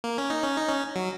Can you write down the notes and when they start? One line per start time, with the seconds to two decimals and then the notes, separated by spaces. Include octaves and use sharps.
0.04 A#3
0.18 C#4
0.30 D#4
0.43 C#4
0.57 D#4
0.69 C#4
0.96 F#3